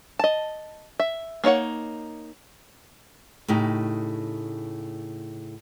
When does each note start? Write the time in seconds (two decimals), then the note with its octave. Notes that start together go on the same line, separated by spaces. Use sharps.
0.19 D#5 A5
1.00 E5
1.44 A#3 D#4 C#5 F#5
3.48 A2 C#3 D#4 G4